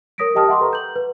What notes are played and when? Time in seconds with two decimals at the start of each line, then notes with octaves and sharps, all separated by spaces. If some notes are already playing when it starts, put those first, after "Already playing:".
0.18 A#4 C#5 D#6 A#6 B6 D7
0.35 G4 D#5 G5 A5 D#6 F6
0.48 E5 F#5 C6 D6
0.60 A4 B4 A#5 C#6
0.73 G6 F#7
0.96 B4